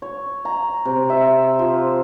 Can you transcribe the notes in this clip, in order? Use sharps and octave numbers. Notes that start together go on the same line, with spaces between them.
C#5
A#5
C3
E5
F3